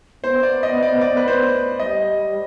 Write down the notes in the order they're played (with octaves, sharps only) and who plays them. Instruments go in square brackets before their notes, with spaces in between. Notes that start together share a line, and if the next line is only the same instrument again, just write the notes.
[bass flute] B3 [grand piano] C5
[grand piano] D5
D#5
D5
D5
B4
C5
[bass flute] G3 [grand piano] D#5